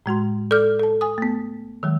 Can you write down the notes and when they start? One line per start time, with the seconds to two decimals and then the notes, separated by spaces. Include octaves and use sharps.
0.06 A2 G#3 F#4 C6
0.51 A4 D5 D6 F6 G6
0.80 A4 A5
1.01 G#5 D#6
1.18 A3 B3
1.83 D#3 F#3 G#3